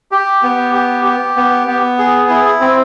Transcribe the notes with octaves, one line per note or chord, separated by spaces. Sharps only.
G4
B3
G4
G4
B3
B3
G#4
E4
C4